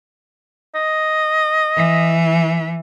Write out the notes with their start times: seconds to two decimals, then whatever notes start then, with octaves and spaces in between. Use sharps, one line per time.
0.75 D#5
1.76 E3